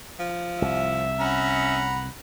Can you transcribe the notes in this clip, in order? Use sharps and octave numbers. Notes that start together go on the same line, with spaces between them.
F3
C2 E5
C#4 F#5 A#5 B5